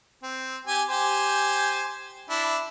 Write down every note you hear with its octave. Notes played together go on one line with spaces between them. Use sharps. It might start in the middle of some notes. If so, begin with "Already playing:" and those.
C4
G4 G#5
G4 C5 G#5
D4 E4